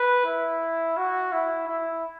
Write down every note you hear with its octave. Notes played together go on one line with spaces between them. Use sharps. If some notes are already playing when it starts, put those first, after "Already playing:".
Already playing: B4
E4
F#4
E4
E4